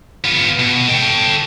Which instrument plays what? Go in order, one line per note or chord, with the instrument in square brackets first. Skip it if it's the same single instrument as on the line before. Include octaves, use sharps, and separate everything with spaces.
[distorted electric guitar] B3 F4
B2
A4 G5